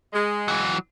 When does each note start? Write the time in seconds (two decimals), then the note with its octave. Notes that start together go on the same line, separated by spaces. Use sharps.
0.13 G#3
0.48 E3 F#3